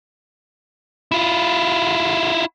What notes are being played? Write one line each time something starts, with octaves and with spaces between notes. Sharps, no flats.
E4 F4